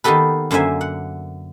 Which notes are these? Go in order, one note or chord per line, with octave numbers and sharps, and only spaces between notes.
D#3 A#3 B3 G4 A4 B4
F#2 D3 A#3 C5 E5 G#5
F#5